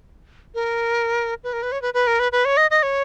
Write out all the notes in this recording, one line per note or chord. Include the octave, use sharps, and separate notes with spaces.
A#4
B4
A#4
B4
C#5
B4
B4
A#4
B4
B4
C#5
D#5
D#5
C#5